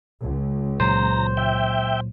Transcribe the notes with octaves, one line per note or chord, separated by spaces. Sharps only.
C#2
A#2 F#3 C5 A#5
E5 G5